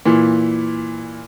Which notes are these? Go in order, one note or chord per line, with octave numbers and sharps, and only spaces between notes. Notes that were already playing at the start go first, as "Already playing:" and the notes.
A#2 E3